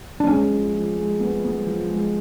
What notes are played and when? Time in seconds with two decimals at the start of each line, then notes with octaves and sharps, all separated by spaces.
0.20 D4
0.27 G#3 C#4
0.50 F3
0.74 F3
0.96 G#3
1.20 B3
1.44 B3
1.67 F3
1.90 G#3